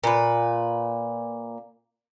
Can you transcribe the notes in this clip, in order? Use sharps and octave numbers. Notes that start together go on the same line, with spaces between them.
A#2 B4